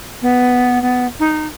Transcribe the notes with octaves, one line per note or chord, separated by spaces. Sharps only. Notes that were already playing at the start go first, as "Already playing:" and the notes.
B3
B3
D#4